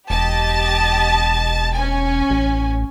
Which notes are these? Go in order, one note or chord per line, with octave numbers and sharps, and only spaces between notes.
E1 G4 D#5 A5
C#4 G#5
A1